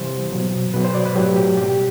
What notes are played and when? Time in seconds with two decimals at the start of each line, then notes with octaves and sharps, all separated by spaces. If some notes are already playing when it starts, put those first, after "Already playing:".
Already playing: C3 E3 G3 C5
0.32 B2 F#3
0.74 B2 F#3 B4
0.84 C5
0.95 D5
1.06 B4
1.16 A2 F#3 G4
1.36 G4
1.57 B2 G3 G4